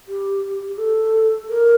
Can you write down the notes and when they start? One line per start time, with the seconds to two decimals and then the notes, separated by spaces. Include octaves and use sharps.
0.08 G4
0.69 G4
0.78 A4
1.49 A#4